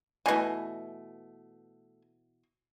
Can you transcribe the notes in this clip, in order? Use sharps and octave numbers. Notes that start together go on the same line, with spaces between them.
B2 E3 A3 D#5 G#5